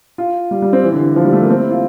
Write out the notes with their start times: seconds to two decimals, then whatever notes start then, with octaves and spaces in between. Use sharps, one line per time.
0.18 F4
0.51 G3
0.62 G3
0.73 C4
0.84 E3
0.92 D3
1.00 E3
1.16 F3
1.25 G3
1.33 A3
1.41 A#3
1.49 C4
1.60 E4
1.71 F4